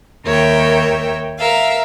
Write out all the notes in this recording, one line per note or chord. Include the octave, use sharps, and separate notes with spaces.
D#2 A#4 C#5 E5 G5
A#4 E5 F5